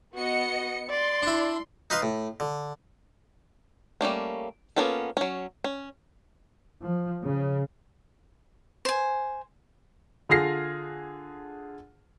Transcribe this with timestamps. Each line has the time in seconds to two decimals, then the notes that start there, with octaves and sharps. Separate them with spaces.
0.15 B3 F#4 D#5 C#7
0.90 D5 C6
1.22 D4 E4
1.90 D#4 B4 D#5 F5 C6
2.02 A2
2.40 D3
4.01 G3 A3 A#3 C#4
4.76 A#3 B3 C#4 F4 A4
5.17 F#3 C#4
5.64 C#4
6.82 F3
7.23 C#3
8.85 C5 G#5
10.29 D3 F4 G#4 F6 A#6 C7